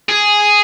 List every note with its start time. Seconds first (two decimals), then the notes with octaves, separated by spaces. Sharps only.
0.09 G#4